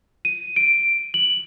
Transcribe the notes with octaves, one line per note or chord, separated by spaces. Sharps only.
D#7
D7
F#7